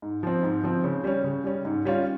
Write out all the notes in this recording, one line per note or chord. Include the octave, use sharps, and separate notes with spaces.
G#2
F3 C4
G#2
F3 C4
C#3
G3 C#4
C#3
G3 C#4
G#2
G3 C#4 F4